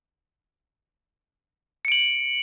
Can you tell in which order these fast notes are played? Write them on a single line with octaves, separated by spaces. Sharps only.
C#7 D7 F#7